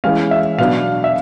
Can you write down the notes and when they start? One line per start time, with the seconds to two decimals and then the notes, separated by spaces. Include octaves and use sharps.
0.04 E3 G#3 C#4 F5
0.31 E5
0.58 B2 F#3 B3 D4 F5
1.04 E5